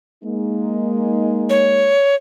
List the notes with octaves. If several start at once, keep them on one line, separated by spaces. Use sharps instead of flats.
G#3 A#3 D#4
C#5